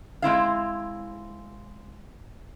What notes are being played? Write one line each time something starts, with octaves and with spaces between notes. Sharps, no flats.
G#3 C4 E4 F5